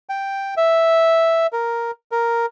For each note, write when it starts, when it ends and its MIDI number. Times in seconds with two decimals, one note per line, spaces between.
0.09 0.54 79
0.57 1.47 76
1.53 1.91 70
2.12 2.46 70